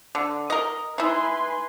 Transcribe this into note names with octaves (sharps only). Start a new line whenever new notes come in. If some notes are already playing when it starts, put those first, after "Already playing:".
D3
A#4 D#5
D#4 E4 B4 G#5 C6